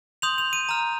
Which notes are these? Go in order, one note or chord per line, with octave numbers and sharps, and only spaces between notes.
C6 D#6 G6 F7
F7
D#7
A#5 F6